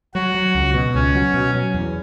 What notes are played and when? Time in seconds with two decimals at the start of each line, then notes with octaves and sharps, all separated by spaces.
0.14 F#3 F#4
0.35 F#3
0.55 C#2
0.74 B2
0.95 C#2 C#4
1.14 F#3
1.34 B2
1.54 F#3
1.74 E2